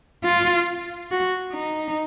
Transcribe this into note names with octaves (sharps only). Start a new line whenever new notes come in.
F4
F#4
D#4